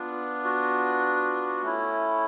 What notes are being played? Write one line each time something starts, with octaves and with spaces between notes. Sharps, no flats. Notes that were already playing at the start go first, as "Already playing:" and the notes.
Already playing: B3 D4 F4
F#4
A3 C#4 E4